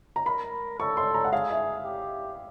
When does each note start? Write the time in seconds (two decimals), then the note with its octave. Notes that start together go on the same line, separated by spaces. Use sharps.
0.16 A#5
0.26 A#4 B5
0.79 A4 C#6
0.97 C6
1.14 A#5
1.25 F#5
1.32 G#4 F5
1.50 E5
1.85 G4